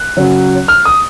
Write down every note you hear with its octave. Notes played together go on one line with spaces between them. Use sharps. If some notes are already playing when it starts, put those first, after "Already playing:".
Already playing: F#6
C#3 F#3
F6
D#6